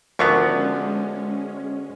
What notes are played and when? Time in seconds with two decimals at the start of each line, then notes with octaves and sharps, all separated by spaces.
0.19 D2 D3 D#3 F3 G#3 B3 C#4 C#6